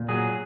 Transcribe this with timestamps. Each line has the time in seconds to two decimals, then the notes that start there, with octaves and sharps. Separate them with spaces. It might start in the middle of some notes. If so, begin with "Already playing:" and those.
Already playing: A#2
0.09 F#3 G#4